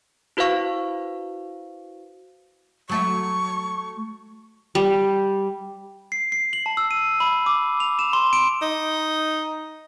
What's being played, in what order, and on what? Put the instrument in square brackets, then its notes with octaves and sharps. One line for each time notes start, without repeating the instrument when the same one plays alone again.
[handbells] E4 F#4 B4 C5 F5 C#6
[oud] F#3 A3 E5 [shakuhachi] C#6
[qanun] G3
[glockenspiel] C7
C7
F#7
A5
E6
D#7
B5
D6
F7
E7
C6
D7
[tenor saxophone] D#4